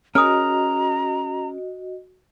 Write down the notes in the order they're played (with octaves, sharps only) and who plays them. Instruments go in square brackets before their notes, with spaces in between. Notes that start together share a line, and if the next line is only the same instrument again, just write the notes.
[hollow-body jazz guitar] C#4 G#4 A#4 [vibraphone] F#4 D#5 [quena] A#5 [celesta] D#6 F6